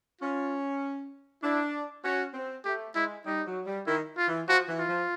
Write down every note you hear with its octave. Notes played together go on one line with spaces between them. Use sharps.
C#4 F4
D4 E4
C#4 F#4
C4
A3 G4
G#3 E4
G3 D#4
F#3
G3
D#3 E4
F4
E3
F3 F#4
E3
F4
F3